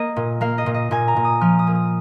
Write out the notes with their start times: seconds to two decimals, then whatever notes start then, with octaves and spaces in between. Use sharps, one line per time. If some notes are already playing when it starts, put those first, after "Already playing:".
Already playing: A#3 D#5
0.16 A#2
0.41 A#3 F5
0.58 D#5
0.66 A#2
0.74 D#5
0.91 A#2 G#5
1.08 A#5
1.16 A#2
1.24 D#6
1.41 F3 F6
1.59 D#6
1.67 A#3
1.75 D#6